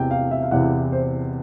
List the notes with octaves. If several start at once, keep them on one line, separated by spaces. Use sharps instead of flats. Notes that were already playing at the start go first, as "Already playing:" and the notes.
Already playing: E2 C3 E3 G5
F5
E5
F5
E2 C3 E3 F#5
C5